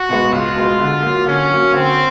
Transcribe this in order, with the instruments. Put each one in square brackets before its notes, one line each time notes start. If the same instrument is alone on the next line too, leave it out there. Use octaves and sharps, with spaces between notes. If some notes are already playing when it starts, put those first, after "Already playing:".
Already playing: [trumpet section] F#4
[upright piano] B2 G#3 B3
[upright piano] C#2 [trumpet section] F4
[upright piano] B2 G#3 B3
D3
F#3 A#3
[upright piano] D3 [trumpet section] C#4
[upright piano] F#3 A#3
[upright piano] D3 [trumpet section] C4